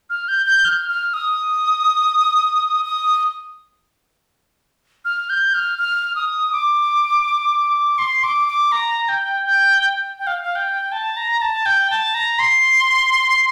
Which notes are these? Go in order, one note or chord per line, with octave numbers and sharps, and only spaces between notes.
F6
G6
G6
F6
F6
D#6
D#6
F6
G6
F6
F6
D#6
D6
C6
D6
D6
A#5
G5
G5
G5
F5
F5
G5
A5
A#5
A5
G5
A5
A#5
C6